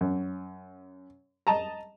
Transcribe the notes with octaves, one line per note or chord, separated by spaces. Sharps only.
F#2
D#5 A5 A#5